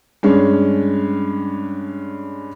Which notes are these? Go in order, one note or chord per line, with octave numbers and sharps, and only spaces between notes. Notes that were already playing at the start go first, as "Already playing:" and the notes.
G2 G#3 C#4 D4